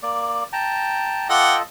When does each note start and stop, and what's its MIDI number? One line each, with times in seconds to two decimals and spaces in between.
0.03 0.44 58
0.03 0.44 74
0.53 1.28 79
0.53 1.28 81
0.53 1.28 82
1.29 1.62 65
1.29 1.62 69
1.29 1.62 75
1.29 1.55 78
1.29 1.55 79
1.29 1.55 86